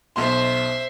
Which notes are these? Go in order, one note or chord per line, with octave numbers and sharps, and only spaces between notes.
B1 B2 C5 E5 C6